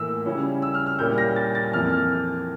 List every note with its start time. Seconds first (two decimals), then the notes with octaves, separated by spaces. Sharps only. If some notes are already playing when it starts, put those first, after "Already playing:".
Already playing: A2 E3 A#3 E4 E6
0.25 C#3 G3 C#4 E4
0.62 E6
0.74 F6
0.86 F6
0.99 A#2 G3 C#4 E4 G6
1.18 A#6
1.36 A6
1.55 A6
1.73 F2 E3 A#3 E4 F6
1.92 F6